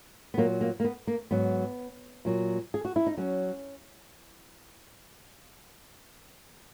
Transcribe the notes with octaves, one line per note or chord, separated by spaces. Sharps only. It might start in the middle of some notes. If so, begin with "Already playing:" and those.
B3
A#2 F#3 A#3
A#3
A#3
B3
A#3
G#2 F#3 B3
A#2 F#3
G#4
F#4
E4
D#4
F#3 C#4